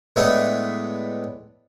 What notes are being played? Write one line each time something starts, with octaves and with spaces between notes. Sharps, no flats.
A2 G#3 A3 B3 D4